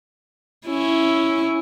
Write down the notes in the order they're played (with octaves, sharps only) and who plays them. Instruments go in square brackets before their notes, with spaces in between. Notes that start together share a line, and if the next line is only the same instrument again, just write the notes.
[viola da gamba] C#4 E4